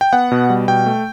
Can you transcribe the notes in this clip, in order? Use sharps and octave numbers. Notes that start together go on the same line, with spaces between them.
G5
B3 F#5
B2
G3
B2 G5
A3